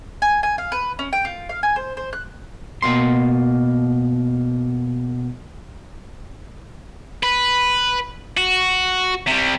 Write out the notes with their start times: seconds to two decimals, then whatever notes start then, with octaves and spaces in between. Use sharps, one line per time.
0.22 G#5
0.43 G#5
0.58 F5
0.72 B4
0.99 C#4
1.13 G5
1.25 F4
1.49 F5
1.63 G#5
1.76 C5
1.97 C5
2.13 F#6
2.82 B2 A#3 C6
7.23 B4
8.37 F#4
9.28 C3 G3